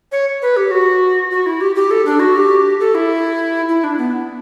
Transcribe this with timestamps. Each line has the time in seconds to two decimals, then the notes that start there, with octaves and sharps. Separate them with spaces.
0.12 C#5
0.42 B4
0.57 G4
0.71 F#4
1.31 F#4
1.46 E4
1.61 G4
1.75 G4
1.91 A4
2.06 D4
2.20 F#4
2.35 G4
2.80 A4
2.95 E4
3.69 E4
3.84 D4
3.98 B3